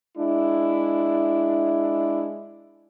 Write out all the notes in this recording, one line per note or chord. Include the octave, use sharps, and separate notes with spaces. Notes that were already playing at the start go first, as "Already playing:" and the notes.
G#3 D4 E4